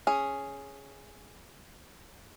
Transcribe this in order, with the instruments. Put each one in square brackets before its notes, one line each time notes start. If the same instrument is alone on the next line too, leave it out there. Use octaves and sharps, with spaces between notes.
[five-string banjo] C#4 G#4